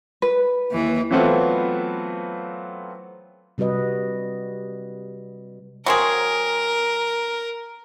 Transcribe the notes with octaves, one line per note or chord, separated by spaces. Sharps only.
B4
D#2 E3
E3 F#3 A3 B3 C4 F4
C3 G3 F#4 B4 D#5
F#3 C4 G#4 A#4